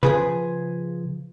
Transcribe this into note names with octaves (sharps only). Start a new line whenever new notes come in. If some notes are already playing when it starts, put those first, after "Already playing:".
C#3 F3 G#4 B4